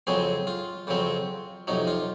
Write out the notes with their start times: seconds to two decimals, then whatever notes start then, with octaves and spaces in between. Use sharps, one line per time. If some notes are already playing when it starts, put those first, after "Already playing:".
0.07 F2 C#3 F#3 C4 G#4
0.47 F4
0.87 F2 C#3 F#3 C4
1.67 F2 C3 F#3 D#4
1.87 F4